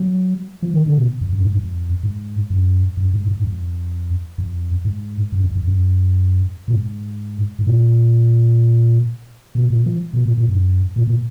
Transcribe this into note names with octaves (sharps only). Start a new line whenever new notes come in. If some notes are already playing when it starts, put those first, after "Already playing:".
Already playing: F#3
F3
D#3
D3
B2
F2
F#2
G#2
F2
G#2
F#2
F#2
G#2
G#2
F2
F2
G#2
F#2
F2
F2
F#2
A#2
G#2
G#2
A#2
B2
A#2
F3
B2
A#2
A#2
F#2
A#2
A#2